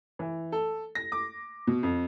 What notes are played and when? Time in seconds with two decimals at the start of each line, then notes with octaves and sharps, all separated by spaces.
0.19 E3
0.52 A4
0.95 A#6
1.12 D6
1.67 B2
1.83 F2